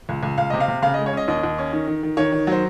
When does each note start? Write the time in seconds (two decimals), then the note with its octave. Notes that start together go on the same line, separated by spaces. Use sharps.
0.09 C#2
0.23 C#2
0.38 C#2 F5
0.50 C3 D#5
0.60 F5
0.68 C3
0.82 C#3 F5
0.94 D#5
0.99 G#3
1.06 C#5
1.13 C#4 D#5
1.28 D#2 D#5
1.43 D#2
1.58 C#4
1.73 D#3
1.88 D#3
2.03 D#3
2.17 D#3 C#5
2.32 D#3
2.47 F#3 C5